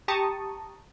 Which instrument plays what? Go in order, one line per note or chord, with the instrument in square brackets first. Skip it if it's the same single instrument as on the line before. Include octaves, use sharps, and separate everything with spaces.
[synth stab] G4 A5 A#5 C#6 D#6